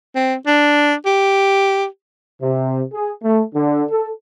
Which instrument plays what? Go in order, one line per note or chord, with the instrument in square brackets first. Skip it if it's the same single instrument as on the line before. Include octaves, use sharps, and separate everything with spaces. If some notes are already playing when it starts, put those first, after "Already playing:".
[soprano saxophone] C4
D4
G4
[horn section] C3
G#4
A3
D3
A4